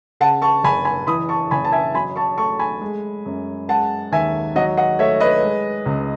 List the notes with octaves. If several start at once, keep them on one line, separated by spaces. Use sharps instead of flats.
C#3 F#5 A5
A5 C#6
F#1 G#5 B5
G#5 B5
E3 B5 D#6
A5 C#6
F#1 G#5 B5
A5
E5 G#5
F#3 G#5 B5
A5 C#6
A3 A5 C#6
G#5 B5
G#3
F#2
G#3 F#5 A5
D#2 E5 G#5
F#3 D#5 F#5
D#5 F#5
A3 C#5 E5
B4 D#5
G#3
C#2